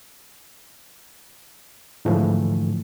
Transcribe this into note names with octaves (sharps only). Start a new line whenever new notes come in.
G#2 D3 E3 F3 A3